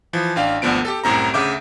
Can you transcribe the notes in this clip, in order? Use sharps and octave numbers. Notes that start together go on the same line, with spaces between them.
E3 F3
A1 D4 F5 G5
G#1 D2 D3 F3 B3 D7
G4 A4
C2 F#2 A2 C3 A#5
D2 C#3 E5 D6 G6 D7